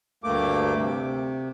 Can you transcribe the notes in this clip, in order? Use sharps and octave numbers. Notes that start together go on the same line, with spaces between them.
D2 G2 A3 A#3 D6
C3